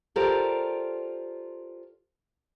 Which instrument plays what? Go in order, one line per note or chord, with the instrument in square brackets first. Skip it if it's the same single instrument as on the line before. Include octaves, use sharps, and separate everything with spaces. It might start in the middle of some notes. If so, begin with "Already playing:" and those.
[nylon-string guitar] F4 G4 A4 A#4 C5 D5